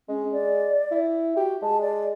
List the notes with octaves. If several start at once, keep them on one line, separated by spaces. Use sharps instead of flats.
G#3 C#4
D5
E4
F#4 G4
G#3 A5
D5